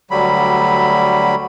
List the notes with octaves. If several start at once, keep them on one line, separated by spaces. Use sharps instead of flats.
D2 D3 F#3 G3 B5